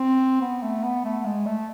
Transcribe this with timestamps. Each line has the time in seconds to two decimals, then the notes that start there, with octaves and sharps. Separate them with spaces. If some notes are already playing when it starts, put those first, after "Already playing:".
Already playing: C4
0.41 B3
0.63 A3
0.84 B3
1.04 A3
1.25 G#3
1.46 A3